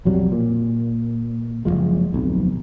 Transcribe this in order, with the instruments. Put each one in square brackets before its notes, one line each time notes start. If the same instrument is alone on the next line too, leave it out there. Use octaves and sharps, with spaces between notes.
[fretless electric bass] B1 F2 F#3 G3
A#2
F#1 F2 F3 G#3
D1 B1 F2